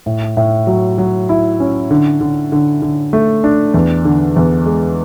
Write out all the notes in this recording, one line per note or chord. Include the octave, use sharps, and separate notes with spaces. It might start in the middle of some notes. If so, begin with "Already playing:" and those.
A2
A2
F#3
F#3
E4
C#4
D3
D3
D3
D3
A3
D4
E2
D3
E2
G#3